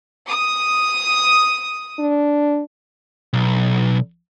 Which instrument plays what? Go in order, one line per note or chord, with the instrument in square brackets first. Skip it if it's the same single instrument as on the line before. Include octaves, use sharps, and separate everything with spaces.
[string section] D#6
[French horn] D4
[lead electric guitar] B1